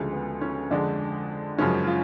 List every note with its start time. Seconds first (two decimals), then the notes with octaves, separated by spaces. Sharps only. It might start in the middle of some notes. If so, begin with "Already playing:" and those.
Already playing: D2 C#3 F3 G#3
0.13 B3
0.41 C#4
0.70 F2 D3 G#3 D4
1.58 F#2 C#3 F3 G#3 C#4
1.87 F4